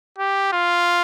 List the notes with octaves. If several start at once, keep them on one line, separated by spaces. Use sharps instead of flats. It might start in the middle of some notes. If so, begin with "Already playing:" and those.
G4
F4